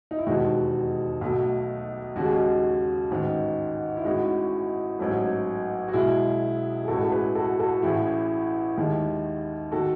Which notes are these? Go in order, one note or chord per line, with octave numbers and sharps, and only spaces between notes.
D#4
E4
E1 D#2 D#3 G#3 D#4 F#4
B1 B2 A3
D#2 C#3 G#3 F#4
G#4
D#4 F#4
A1 G#2 D#3
E4
A1 A2 G#3 D#4 F#4
A1 G#2 F#3 A3
F#4
B1 B2 G#3 E4 G#4
G#4
A1 A2 G#3 F#4 A4
A4
G#4 B4
F#4 A4
F#4 A4
A1 A2 E3 E4 G#4
D#2 D#3 G#3
D#3 F#4 A4